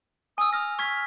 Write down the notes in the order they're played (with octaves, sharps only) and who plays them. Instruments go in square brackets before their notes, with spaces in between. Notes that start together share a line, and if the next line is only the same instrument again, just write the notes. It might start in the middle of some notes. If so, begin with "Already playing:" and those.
[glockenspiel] G#5 E6 [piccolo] D#6
[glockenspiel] D#6 A#6 [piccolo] F6
[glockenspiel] C#6 G#6 B6